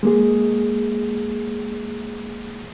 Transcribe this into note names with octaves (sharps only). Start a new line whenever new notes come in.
G#3 A#3 G#4